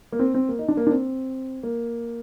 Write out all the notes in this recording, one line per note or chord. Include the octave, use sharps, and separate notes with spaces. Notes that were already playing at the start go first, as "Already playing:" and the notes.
A#3
C4
C4
A#3
D#4
D4
A#3
D4
C4
A#3